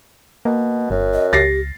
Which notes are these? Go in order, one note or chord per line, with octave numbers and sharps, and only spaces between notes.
B2 A#3
G1 F#2
D#5
C#2 G4 A6 A#6 C7